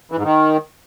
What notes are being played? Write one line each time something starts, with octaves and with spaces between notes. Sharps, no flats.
E3
G#2
D#3